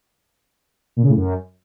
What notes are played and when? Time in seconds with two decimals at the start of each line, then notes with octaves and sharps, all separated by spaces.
0.96 A#2
1.03 C#3
1.09 A2
1.16 F#2